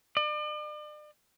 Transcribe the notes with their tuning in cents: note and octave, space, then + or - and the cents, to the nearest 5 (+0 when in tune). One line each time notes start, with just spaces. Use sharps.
D5 +40